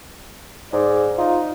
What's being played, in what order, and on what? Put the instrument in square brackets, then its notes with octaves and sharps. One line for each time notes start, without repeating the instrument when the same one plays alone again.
[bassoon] G#2 [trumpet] D5
[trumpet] D#4 [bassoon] F4